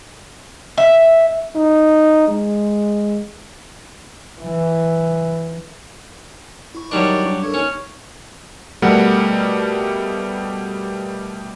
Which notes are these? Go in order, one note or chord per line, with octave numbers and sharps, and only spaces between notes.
E5
D#4
G#3
E3
E4 C#6
D#3 F#3 G3 D4 D5
G2 C#6 D6
D4 A4 A#4 C#5
D#2 C#4
B2 G3 A3 A#4 F#5